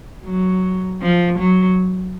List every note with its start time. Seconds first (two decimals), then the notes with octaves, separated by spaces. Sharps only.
0.25 F#3
1.02 F3
1.39 F#3